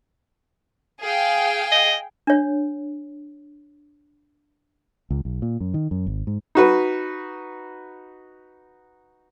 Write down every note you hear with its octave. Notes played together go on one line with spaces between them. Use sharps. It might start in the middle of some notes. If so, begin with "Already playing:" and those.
G#4 F5 G5
D#5
D4 C#5
C#2
B1
A#2
F#2
D#3
F#2
G#1
G#2
D#4 F#4 B4